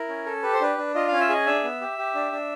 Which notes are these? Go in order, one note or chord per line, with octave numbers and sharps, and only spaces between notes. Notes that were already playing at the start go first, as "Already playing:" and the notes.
Already playing: E4 A#4
C#4
A4
G4 B4
C5
D4 B4
D4
F4 D#5
C#4 F5
E5
G#4 D#5
D4 E5
B3
G4
G4
D4
D4